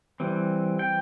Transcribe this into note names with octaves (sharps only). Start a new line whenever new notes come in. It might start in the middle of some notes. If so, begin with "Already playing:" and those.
E3 G3 C4
G5